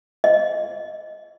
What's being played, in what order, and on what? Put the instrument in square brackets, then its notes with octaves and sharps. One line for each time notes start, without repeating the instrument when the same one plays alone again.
[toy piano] D#5